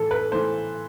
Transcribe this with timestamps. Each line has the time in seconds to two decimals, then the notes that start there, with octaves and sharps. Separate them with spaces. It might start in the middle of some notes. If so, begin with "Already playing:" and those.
Already playing: A2 E3 A3 A4
0.11 B4
0.32 A2 E3 A3 C5